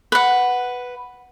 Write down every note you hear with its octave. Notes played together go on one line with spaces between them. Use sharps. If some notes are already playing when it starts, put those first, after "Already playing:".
B4 F#5